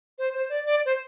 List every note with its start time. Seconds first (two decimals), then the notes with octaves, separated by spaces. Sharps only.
0.19 C5
0.34 C5
0.49 D5
0.65 D5
0.85 C5